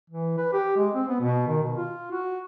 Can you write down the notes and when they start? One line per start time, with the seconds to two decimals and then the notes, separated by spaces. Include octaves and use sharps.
0.10 E3
0.38 B4
0.53 G4
0.77 G#3
0.94 C4
1.09 B3
1.21 B2
1.48 D#3
1.63 B2
1.77 F4
2.12 F#4